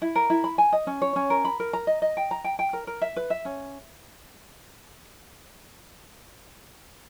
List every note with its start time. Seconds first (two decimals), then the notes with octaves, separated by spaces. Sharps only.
0.02 E4
0.15 A#4
0.30 E4
0.44 B5
0.58 G#5
0.72 D#5
0.87 C#4
1.02 C#5
1.16 C#4
1.30 A#4
1.45 B5
1.60 A#4
1.73 A#5
1.87 D#5
2.02 D#5
2.17 G5
2.31 A#5
2.44 G5
2.59 G5
2.73 A#4
2.87 A#4
3.02 E5
3.16 B4
3.30 E5
3.45 C#4